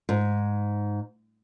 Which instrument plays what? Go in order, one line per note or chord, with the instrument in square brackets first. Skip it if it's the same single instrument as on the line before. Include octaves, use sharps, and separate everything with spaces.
[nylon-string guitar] G#2